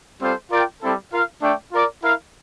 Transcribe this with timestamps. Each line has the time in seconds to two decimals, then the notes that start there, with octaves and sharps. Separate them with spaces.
0.21 G3 C4 F4 A4 C5
0.51 F4 A#4 D5 G5
0.81 G3 C4 E4 A4
1.12 F4 A#4 F5
1.42 A3 D4 A4 D5 G5
1.72 F4 A#4 D5
2.02 E4 A#4 F5